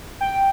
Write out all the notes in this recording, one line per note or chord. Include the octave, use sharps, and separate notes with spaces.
G5